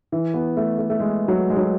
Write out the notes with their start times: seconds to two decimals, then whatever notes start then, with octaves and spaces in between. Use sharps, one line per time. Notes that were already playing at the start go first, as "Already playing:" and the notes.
0.12 E3
0.34 B3
0.57 A3
0.79 A3
0.90 A3
1.00 G#3
1.28 F#3
1.50 G#3
1.57 F#3